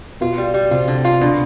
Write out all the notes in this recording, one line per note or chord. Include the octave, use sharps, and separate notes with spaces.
B2 B3 F4
G3
G3
C3 C4 F4
D3
F4
B2 D3 D4